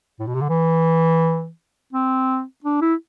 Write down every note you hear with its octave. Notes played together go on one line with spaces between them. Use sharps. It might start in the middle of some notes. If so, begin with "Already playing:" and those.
A2
B2
C3
D3
E3
C4
D4
E4